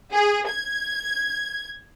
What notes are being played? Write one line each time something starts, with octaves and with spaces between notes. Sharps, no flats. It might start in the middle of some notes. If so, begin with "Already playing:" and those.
G#4
G#6